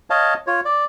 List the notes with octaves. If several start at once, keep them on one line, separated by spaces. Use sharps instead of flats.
C#5 D#5 F5 A5
F4 C#5
D5